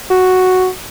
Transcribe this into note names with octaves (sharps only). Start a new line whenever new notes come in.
F#4